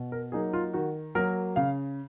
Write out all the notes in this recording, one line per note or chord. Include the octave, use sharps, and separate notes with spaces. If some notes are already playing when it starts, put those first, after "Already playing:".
Already playing: B2
A#4
F#3 A#3 D#4 G#4
F4
D#3 F#4
F#3 A#3 A#4
C#3 F5